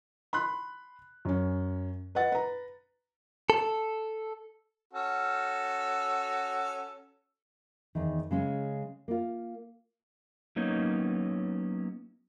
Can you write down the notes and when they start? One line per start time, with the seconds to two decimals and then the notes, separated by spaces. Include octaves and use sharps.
0.33 B5 C6 F#6
1.25 F#2 C#4
2.15 B4 D#5 F#5 A6
2.32 B4 A#5
3.50 A4
4.93 C#4 F#4 A4
7.95 E2 D#3
8.31 C#3 G#3 C#4
9.08 A#3 F4
10.56 F#3 A#3 B3 C#4 D#4 C#5